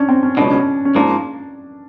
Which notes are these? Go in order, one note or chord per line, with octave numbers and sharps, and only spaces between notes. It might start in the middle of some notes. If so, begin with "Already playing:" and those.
Already playing: C#4 D4
C4
C#4
C#2 B2 F#3 D4
C#4
C#4
G#2 F3 A#3 D4